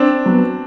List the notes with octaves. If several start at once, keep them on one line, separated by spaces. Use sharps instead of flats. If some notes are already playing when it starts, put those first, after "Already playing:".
Already playing: C4 D4
F#3 B3